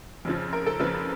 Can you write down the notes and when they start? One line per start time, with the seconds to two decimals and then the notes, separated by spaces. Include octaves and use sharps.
0.25 F2 C#3 F3
0.53 A#4
0.66 A4
0.80 F2 C#3 F3 B4